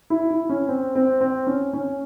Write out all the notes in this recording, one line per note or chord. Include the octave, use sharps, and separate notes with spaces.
E4
E4
C#4
C4
C4
C4
C#4
C#4